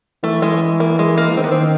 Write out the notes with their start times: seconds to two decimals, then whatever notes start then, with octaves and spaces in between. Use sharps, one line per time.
0.23 E3 A3
0.42 G#3
0.80 A#3
0.99 G#3
1.18 A#3
1.30 E3
1.37 D#3 C4
1.44 B3
1.51 C4